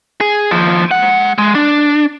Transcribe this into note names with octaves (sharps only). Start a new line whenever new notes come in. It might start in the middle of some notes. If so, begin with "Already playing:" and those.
G#4
D#2 F3
G#3 F#5
G#3
D4